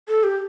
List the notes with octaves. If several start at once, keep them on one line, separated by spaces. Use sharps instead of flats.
A4
G4